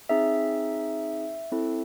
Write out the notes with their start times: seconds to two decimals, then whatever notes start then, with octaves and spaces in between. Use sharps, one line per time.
0.09 C4 D#4 G#4 E5
1.52 C4 E4 A4